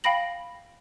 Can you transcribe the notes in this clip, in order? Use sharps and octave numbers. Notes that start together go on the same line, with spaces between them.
F5 G5 B5 A#6 F#7